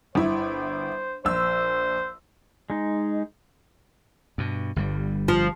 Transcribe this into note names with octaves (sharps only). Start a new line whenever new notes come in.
G1 E4 C5
A#1 C5 E6
G#3 D#4
G2 B2
G1 G2 G3
F3